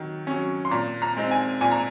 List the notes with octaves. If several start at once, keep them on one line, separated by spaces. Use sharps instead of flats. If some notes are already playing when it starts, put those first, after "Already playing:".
Already playing: D#3 F#3
F#3 C#4
C6
A#2 A#5
A#5
G#3 C4 D#4
G#5
A#2 G#5
A#5